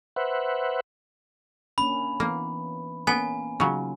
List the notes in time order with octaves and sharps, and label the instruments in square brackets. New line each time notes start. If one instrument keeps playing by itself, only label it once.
[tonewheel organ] B4 C5 E5 F#5
[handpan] A#3 C#4 D4 [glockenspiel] B5
[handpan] E3 B3 [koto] A#3
[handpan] A#3 C#4 [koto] B3 [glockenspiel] G#5
[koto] C#3 F#3 [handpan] D#4 F4